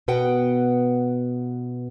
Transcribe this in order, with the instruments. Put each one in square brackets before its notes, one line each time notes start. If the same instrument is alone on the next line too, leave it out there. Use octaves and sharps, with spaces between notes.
[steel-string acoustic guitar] B2 B3 B4 F#5 G5